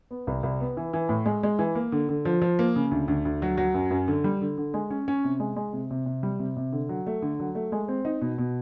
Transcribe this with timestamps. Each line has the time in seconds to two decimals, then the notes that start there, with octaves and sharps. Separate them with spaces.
0.11 B3
0.27 C2
0.43 C2
0.60 B3
0.77 E3
0.93 E3
1.09 A2
1.26 G#3
1.43 G#3
1.59 E3
1.75 A#3
1.92 D3
2.09 D3
2.25 F3
2.42 F3
2.59 A#3
2.76 C#3
2.91 D2
3.08 D2
3.25 D2
3.42 F#3
3.58 F#3
3.74 F#2
3.91 F#2
4.08 D3
4.24 G3
4.42 D3
4.58 D3
4.74 G#3
4.90 C#4
5.08 C#4
5.24 C3
5.40 G#3
5.56 G#3
5.73 C3
5.91 C3
6.06 C3
6.23 G3
6.39 C3
6.57 C3
6.72 D3
6.89 F#3
7.07 A3
7.22 D3
7.40 F#3
7.55 A3
7.72 G#3
7.88 C4
8.05 D#4
8.21 B2
8.38 B2